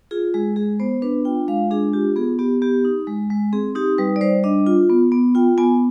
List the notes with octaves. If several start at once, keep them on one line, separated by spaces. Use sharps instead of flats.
F4 G#4
G#3 G#4
G#3 G#4
B3 C5
D4 B4
F4 G5
G#3 F5
D4 G#4
F4 G4
B3 G#4
B3 G4
B3 G4
D#4
G#3
G#3
C4 G#4
D#4 G4
G3 B4
D5
G3 C5
D4 D#5
F4
B3
B3
F4 G5
B3 G#5